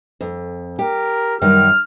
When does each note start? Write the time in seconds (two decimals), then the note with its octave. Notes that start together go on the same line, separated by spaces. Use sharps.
0.21 F2
0.79 G4 A#4
1.42 F#2 D#3 G3 F6